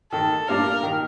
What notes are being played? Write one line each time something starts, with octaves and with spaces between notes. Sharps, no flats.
D#3 A4
G3 A#3 D4 F4 A#4
D#3